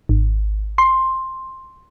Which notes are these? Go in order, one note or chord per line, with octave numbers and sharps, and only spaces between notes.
G#1
C6